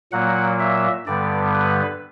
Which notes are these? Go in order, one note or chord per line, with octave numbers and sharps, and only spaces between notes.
A#2 F#3 A#3 F#5
E5
G2 D3 G3 B3 D5
B4